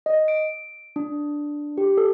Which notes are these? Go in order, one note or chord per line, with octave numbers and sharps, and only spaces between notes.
D#5
D7
D4
G4
A4